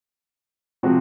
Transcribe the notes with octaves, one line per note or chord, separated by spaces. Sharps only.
C3 F3 G#3 C4 F#4